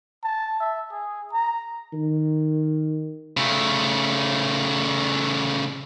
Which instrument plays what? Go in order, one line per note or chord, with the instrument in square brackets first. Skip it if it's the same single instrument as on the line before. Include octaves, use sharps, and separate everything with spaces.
[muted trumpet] A5
E5
G#4
A#5
[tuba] D#3
[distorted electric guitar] C#3 A3